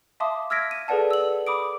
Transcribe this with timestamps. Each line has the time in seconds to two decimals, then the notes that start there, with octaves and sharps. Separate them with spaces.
0.20 E5 F5 A5 C6 D6 D#6
0.50 E6 F6 G#6 A#6 B6 D7
0.71 D#7
0.88 G#4 A4 B4 D5 F#5 A5
1.11 E6 F#7
1.47 B5 D6 D#6 D7